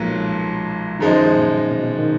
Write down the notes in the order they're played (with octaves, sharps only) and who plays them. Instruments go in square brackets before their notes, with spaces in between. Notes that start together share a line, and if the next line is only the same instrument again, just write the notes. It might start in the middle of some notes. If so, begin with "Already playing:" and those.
Already playing: [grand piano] B1 A#2 F#3 [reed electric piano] F3 G#3
[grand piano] F#2 F3 G#3 D#4 [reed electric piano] D#3 F#3
[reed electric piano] A#2
B2
D#3